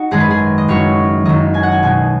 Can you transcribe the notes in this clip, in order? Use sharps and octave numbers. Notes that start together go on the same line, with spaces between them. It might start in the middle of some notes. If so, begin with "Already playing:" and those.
Already playing: D#4 F#4
G#1 F#2 D#3 G#3 G#4
B4
G#4
D#5
F#1 F#2 D#3 F#3 C#5
F#1 F#2 D#3 F#3 D#5
G#5
F#5
G#5
B1 B2 G#3 G#5